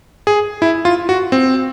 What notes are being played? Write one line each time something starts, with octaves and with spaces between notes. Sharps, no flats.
G#4
E4
F4
F#4
C4